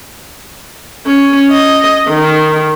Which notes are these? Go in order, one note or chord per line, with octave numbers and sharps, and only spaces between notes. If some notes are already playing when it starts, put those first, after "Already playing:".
C#4
D#5
D#3